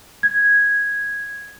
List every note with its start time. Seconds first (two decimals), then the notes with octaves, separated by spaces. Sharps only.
0.23 G#6